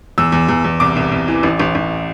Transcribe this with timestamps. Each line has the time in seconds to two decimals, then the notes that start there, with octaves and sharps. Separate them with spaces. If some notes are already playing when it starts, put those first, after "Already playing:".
0.18 E2 E6
0.32 E2
0.48 E2
0.64 E2
0.80 C2 D6
0.96 C2
1.12 C2
1.28 E3
1.43 A1
1.60 A1
1.75 A1